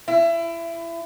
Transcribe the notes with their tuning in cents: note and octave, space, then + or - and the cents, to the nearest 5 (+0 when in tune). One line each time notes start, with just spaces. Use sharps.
E4 +25